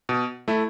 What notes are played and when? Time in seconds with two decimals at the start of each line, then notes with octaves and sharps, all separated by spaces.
0.09 B2
0.48 A3 E4